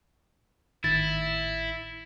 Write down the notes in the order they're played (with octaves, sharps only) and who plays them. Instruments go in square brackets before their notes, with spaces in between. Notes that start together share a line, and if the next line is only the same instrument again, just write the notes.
[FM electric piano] G#1 A2 D#3 [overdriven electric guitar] E4 [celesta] A6